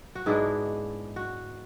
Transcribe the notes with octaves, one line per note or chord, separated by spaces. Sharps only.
F#4
G#2 G#3 B3 D4 E4
F#4